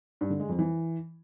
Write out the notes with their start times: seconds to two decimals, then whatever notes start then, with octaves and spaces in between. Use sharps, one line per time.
0.21 G2
0.30 D3
0.40 G#3
0.49 F2
0.59 E3